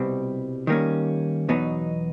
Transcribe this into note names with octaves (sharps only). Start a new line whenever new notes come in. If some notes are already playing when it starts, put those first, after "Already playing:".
Already playing: C2 B2 G3 C4
D#3 G3 A#3 C#4
E2 B2 F#3 B3 D#4